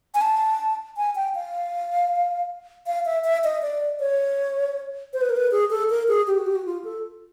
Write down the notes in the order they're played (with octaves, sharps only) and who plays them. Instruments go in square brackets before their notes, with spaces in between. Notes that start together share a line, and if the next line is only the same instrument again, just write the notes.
[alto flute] G#5
A5
G#5
G5
F5
F5
E5
E5
D#5
D5
C#5
C5
B4
A#4
B4
G#4
A4
A#4
G#4
G4
F#4
G4
F#4
F4
A4